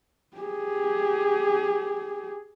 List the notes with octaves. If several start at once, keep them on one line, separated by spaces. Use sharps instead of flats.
G4 G#4